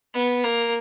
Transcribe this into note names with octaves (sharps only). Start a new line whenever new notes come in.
B3
A#3